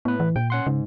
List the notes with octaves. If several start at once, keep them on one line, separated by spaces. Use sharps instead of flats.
A2 B3 B4
E3
A#2 G5
C#4 F#5 C6
G#2 C#3